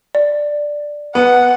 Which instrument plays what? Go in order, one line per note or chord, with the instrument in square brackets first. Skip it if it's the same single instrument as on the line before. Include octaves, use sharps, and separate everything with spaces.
[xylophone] D5
[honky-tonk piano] B3 [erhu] F#5